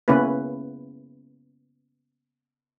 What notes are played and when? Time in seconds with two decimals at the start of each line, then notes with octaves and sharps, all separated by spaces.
0.08 C#3 A#3 B3 C#4 E4 B4